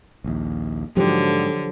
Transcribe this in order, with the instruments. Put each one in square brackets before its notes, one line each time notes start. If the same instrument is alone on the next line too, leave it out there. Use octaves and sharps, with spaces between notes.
[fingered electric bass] A#1 D#2
[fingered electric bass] G#2 [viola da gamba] D3 [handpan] F3 F#3 G4